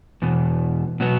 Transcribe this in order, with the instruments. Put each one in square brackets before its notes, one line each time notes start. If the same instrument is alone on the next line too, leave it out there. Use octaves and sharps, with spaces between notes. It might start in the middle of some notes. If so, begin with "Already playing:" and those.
[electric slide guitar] E2 B2
B2 F#3 B3